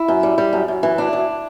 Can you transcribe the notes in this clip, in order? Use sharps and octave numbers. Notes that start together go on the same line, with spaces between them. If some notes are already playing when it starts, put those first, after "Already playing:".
Already playing: E4
F#2
G3
G3
F#2
F#2
E3
D2 D4
D2